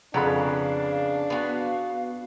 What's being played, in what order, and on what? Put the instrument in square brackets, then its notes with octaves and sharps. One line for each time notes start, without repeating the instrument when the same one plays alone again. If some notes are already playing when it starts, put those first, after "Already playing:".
[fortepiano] F2 F#5 B5 [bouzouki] C#3 B3 A#5 [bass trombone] D4 [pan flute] F5
[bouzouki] B3 F#4